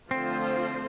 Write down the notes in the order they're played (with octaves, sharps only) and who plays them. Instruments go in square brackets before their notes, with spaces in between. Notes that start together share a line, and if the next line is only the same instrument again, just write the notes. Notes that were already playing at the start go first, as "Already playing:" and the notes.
[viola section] D3 F3 A3 F4 C5 [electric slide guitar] C4